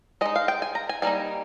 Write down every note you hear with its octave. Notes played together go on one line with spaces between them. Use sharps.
G#3 D#4 D#5
F5
G5
G#5
A#5
G#5
G3 A#3 D#4 G#5